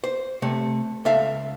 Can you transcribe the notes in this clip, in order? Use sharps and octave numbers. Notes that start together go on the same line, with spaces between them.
C5
C3 A3
C#2 A4 E5 F5